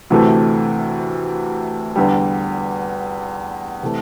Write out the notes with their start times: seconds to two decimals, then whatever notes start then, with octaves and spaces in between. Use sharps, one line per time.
0.10 D2 C3 E3 A3
1.96 E2 D3 G3
3.83 C3 E3 A3